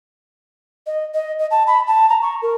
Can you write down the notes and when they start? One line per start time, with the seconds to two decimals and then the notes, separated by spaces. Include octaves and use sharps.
0.86 D#5
1.14 D#5
1.39 D#5
1.50 A5
1.67 B5
1.87 A5
2.09 A#5
2.22 C#6
2.42 A#4